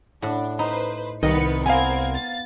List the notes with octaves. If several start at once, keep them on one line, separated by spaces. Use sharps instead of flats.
A2 D4 F#5
D#4 B4 C5 B5
C2 D#3 B3 B4 D#5 C#7
B3 C4 A#4 F5 G#5 G#6
A6